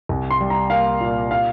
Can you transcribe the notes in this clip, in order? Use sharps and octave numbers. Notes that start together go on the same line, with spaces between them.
C2
C6
G3
A#5
A#3 F5
A#2
F5